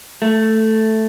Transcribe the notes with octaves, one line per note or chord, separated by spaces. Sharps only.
A3